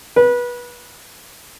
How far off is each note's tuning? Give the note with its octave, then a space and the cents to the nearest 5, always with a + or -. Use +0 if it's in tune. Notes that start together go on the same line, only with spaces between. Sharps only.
B4 -25